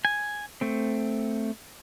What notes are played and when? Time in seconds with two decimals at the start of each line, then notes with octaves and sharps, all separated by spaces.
0.05 G#5
0.61 A3 C4